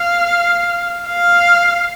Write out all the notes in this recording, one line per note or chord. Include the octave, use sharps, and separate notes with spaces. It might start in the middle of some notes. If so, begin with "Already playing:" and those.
Already playing: F5
F5